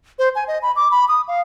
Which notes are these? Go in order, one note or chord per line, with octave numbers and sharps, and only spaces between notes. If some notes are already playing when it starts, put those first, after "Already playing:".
C5
G#5
D#5
B5
D6
B5
D#6
F5